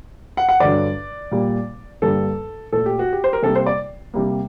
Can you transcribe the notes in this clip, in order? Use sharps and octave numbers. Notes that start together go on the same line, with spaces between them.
F#5
F#5
G2 D3 F#3 D5
A#2 G3 A#3
G2 D3 G3 A#3 A4
A#2 A3 A4
G4
F#4
G4
C5
A#4
C3 G3 A#3 A4
C5
D5
C3 G3 A#3